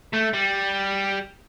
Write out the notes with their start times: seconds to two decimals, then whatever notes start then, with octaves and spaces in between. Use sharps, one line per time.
0.14 A3
0.34 G3